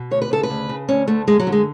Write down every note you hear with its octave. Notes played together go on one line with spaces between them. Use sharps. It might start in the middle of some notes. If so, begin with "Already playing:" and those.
Already playing: B2
D2 C#5
B4
C#3 A4
B4
D2
C#3
D2 C#4
D3 A3
F#2 G#3
F#3
D3
G#3